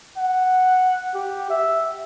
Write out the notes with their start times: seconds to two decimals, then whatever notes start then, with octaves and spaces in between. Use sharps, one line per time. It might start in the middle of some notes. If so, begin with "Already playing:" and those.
0.17 F#5
1.14 G4
1.50 E5